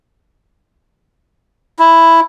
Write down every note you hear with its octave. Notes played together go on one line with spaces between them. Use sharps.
E4